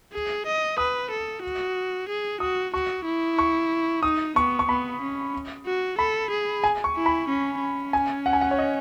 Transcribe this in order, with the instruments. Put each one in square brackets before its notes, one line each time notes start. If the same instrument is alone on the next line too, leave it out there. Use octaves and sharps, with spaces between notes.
[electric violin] G#4
D#5
[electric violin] B4 [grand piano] D#6
[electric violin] A4
F#4
G#4
[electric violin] F#4 [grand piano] D#6
[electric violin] F#4 [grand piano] C#6
[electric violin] E4
[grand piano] C#6
[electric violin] D#4 [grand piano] D#6
[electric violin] B3 [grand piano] C#6
[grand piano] C#6
[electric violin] B3 [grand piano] B5
[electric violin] C#4
F#4
[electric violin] A4 [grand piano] B5
[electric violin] G#4
[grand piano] G#5
C#6
[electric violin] E4
[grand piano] B5
[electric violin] C#4
C#4
[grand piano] G#5
F#5
G#5
F#5
C#5
D#5